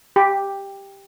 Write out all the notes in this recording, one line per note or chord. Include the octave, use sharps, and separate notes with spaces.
G4